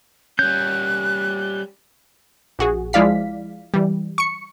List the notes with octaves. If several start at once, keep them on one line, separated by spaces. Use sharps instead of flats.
G3 C#4 F#6 G6
A#1 F#4 G#4
F3 G#3 E4 D5 F5 B6
E3 G3
C#6 C#7